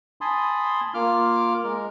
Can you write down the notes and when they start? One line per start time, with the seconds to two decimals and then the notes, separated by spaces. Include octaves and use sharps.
0.21 G#5 A5 B5 C6 D#6
0.94 A#3 F4 D6 F6
1.64 G#3 A#4